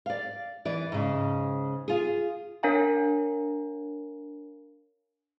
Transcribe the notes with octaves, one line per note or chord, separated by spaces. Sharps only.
D5 F5
E3 D5
G#2 C#3
F4 G#4
D4 A#4 C#5 F5 G#5 A#5